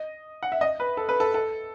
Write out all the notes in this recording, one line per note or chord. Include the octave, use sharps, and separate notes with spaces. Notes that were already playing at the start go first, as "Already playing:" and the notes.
Already playing: D#5
F#5
E5
D#5
B4
A4
B4
A4
A4